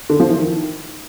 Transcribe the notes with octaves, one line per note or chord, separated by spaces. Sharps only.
D3
F3
E3
D#3